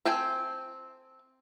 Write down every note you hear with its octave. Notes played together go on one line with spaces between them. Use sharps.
C4 A4 G5 G#5